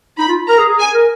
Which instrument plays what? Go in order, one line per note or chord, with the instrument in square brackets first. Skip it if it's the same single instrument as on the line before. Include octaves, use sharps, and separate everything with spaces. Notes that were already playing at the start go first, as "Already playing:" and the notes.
[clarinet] D#4 [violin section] B5
[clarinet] F4
[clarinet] A#4 [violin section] A#5
[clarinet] G#4
G#4
[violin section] G#5
[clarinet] A#4